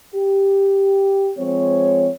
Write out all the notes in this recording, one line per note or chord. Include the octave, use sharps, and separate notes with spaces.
G4
F3 G#3 C4 C#5